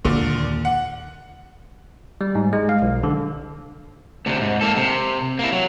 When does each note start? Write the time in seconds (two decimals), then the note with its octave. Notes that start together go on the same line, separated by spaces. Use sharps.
0.05 D#2 A#2 D3
0.65 F#5
2.21 G3
2.35 G#2
2.53 G#3
2.69 F5
2.82 B1
3.03 D3
4.26 D2 C3
4.41 G#2
4.61 A#3 A4
4.76 C3
5.39 A#3 E4
5.52 F#3